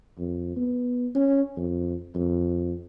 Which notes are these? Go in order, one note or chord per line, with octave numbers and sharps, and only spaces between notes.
F2
B3
C#4
F2
F2